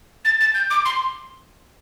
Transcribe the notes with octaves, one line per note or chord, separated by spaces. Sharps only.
A6
A6
G6
D6
C6